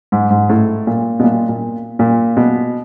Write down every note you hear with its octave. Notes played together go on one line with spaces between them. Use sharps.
G#2
G#2
A2
A#2
B2
A#2
A#2
A#2
B2